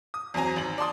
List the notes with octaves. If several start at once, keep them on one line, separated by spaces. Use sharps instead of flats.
D#6
E2 F#3 C4 G#5 A#5
G#1 F#7
D5 A5 C6 D#6